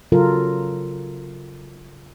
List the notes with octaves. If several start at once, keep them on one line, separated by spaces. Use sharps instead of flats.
C#3 F#3 F4 A4 A#4